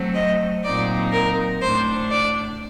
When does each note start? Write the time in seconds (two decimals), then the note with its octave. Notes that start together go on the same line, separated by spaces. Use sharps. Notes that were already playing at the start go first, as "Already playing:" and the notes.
Already playing: F#3 A3 C4
0.15 D#5
0.64 A#2 F#3 C4 D#4 D5
1.12 A#4
1.62 A2 A3 D4 C5
2.11 D5